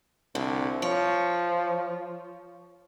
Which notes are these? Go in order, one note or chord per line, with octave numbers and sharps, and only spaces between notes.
C2 D3
F3 C#5